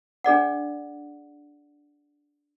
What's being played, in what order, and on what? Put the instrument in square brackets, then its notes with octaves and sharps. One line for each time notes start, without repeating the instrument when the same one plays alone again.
[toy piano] D4 G#4 D5 F#5